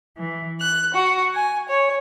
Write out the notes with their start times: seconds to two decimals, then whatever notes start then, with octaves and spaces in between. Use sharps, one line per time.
0.17 E3
0.59 F#6
0.93 F#4
1.34 G#5
1.67 C#5